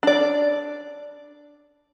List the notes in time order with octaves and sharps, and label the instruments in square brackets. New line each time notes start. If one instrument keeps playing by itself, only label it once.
[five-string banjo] D4 D5